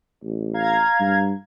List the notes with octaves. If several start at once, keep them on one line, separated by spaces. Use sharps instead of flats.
A1
F5 A#5 G#6
G2